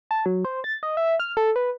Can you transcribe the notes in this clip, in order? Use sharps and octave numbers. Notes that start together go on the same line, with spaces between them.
A5
F#3
C5
A6
D#5
E5
F6
A4
B4